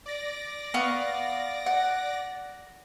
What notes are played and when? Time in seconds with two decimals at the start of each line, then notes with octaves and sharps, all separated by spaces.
0.06 D5 A#6
0.74 B3 F5 C#6
1.66 F#5